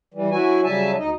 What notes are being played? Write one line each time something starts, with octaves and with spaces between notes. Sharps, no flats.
E3 G3
F#3 E4 F#4 G#5
C#3 F#3 G3 E5 G#5 A5
D2 D#4 D#5